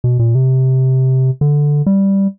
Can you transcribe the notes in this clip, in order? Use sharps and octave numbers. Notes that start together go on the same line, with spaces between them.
B2
A#2
C3
D3
G3